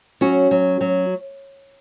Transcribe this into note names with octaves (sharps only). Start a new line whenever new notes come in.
F#3 C#4 F#4
F#3
F#3